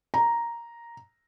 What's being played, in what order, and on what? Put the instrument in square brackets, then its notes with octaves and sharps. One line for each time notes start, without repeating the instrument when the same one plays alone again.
[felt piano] A#5